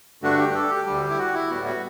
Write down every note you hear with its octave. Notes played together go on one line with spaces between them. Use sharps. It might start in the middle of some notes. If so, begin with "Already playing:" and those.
G2 D3 A3 D4 F#4
G4
A4
G4
D2 D3 G3
E4
F#4
E4
A2 G3 B3 F#4
F#4